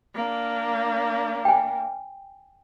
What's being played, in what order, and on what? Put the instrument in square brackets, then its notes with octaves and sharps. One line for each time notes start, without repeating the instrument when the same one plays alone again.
[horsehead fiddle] A#3 D4
[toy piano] G5 G#5